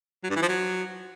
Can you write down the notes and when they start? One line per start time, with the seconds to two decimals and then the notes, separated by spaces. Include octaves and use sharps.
0.23 F#3
0.30 G2
0.36 E3
0.42 F3
0.48 F#3